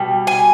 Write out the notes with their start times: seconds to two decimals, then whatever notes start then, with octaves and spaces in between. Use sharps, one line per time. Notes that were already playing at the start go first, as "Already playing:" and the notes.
Already playing: B2 G3
0.27 G#5